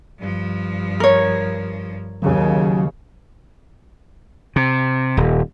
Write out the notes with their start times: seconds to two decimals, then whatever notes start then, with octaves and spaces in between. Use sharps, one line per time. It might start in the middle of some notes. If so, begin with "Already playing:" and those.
0.19 G2 F3
1.00 A#4 C#5
2.22 D#2 C#3 F#3
4.56 C3
5.17 D#1